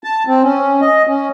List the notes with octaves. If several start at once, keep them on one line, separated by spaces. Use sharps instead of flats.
A5
C4
C#4
D#5
C#4